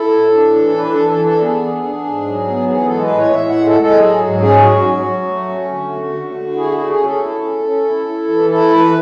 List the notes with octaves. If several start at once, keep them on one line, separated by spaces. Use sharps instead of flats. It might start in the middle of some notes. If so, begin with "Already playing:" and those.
Already playing: E4 A4
A2
D4
E3
D4 B4
A4
E3
A4
D4
A4
B3 G#4
D4
D4
G#2
F#3
B3
E3 G#4
A4
G#3
B4
A2
C#5
A2 E5
F#5
G#3
A4
G#3 A4
F#3 G#4
G#2
C#4 G#4
F#3 F#4
F#3
F#3
A3
C#4
D3
A3
D3
D3
E4 G#4
F#4
A3
G#4
C#4
A4
E4
C#4
C#4
E4
E4
E3
E4 A4
E3 B4